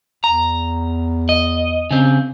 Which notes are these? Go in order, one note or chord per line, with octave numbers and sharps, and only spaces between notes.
E2 A#5
D#5
C#3 C4